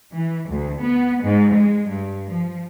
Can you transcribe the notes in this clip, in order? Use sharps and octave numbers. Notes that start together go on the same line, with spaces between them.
E3
D2
B3
G#2
G#3
G2
F3